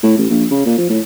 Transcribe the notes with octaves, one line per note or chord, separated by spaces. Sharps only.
A2
A1
A#1
C#3
A#2
F3
A2